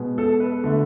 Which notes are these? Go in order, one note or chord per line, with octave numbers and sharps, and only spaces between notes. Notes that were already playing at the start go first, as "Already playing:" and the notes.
Already playing: B2 G#3 B3
A4
B4
D3 A3